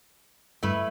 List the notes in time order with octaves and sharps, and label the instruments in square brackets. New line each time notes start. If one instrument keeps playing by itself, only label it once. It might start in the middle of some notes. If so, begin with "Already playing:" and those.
[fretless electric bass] G2 [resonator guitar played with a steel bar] A3 E4 B4